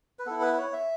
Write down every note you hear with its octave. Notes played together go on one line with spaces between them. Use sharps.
B4
B3 E4 A4
B4
B4
C#5
E5